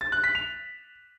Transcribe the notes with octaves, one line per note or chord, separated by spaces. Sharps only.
A6
F#6
B6
F7